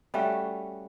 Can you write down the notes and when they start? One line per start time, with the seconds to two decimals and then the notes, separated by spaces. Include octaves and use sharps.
0.14 G3 A3 C#4 F#4